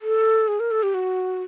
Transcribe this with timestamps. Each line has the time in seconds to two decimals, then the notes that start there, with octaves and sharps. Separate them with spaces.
0.02 A4
0.48 G#4
0.60 A#4
0.71 A4
0.83 G4
0.94 F#4